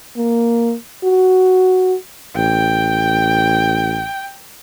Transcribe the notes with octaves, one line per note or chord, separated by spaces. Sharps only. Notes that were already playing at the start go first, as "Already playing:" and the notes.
A#3
F#4
A1 G5